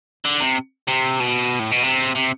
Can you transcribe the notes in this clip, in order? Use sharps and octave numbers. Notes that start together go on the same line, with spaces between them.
D3
C3
C3
B2
A2
B2
C3
C3